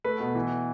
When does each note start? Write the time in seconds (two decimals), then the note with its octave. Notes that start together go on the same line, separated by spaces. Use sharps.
0.04 A3 B4
0.20 B2
0.35 E3